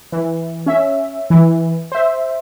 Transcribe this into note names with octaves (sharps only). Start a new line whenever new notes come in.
E3
C#4 E5
E3
C5 E5